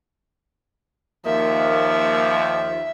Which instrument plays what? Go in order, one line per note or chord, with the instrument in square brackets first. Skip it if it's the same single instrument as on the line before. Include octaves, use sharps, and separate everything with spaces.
[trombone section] D#2 F3 [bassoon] A#3 [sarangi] E5